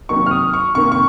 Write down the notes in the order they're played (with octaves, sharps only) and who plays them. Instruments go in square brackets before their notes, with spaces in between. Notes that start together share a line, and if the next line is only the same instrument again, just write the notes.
[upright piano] C3 D#3 F#3 A#3 D#4 C#6
F6
D#6
C#6
C3 D#3 A#3 C#6
C#6